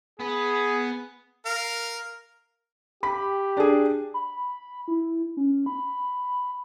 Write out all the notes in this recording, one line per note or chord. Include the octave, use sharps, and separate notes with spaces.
B3 G#4 B4
A#4 F5
G4 B5
D4 G#4
B5
E4
C#4
B5